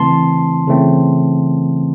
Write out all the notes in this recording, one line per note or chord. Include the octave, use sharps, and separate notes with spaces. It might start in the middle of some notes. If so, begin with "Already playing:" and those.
Already playing: C#3 E3 A3 C4 A5 C6
C#3 E3 A3 C4